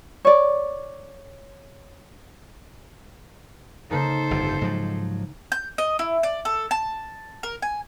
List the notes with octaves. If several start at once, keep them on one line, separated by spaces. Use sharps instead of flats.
C#5 D5
C#3 A#3 D#4 A4 C5
G1 F2
G#2 F3 F#3
G6
D#5
E4
D5
A4
A5
A#4
G#5